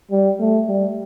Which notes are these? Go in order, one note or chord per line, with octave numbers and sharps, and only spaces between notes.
G3
A3
G3